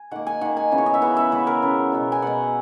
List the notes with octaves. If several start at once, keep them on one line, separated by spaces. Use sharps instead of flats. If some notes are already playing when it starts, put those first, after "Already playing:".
Already playing: G#5
D#3 A#3 F#5
G#5
D#3 A#3 F#5
G#5
C#3 E3 B3
C#5
D#5
E5
C#3 E3 B3 F#5
E5
C#3 E3 B3 B4
A#4
C#3 E3 B3
B2 F#3 B3
G#5
B2 F#3 B3 F#5